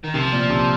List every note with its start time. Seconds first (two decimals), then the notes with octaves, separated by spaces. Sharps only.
0.04 D#3
0.14 C3 F3
0.32 A#2
0.50 C3